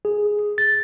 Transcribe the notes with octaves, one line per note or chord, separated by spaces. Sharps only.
G#4
A6